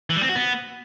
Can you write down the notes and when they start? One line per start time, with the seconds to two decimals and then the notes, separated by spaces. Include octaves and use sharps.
0.10 E3
0.16 G3
0.23 C4
0.29 F#4
0.35 B3